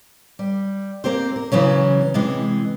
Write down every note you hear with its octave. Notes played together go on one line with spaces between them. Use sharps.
G3
A#3 C4 G4 C5
A#4
C#3 E3 F#3 C#4
C3 E3 G#3